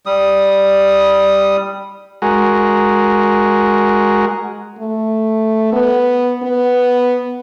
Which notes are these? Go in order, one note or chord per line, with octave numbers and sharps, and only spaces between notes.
G3 D#6
G#3 F#4 A#4
A3
B3
B3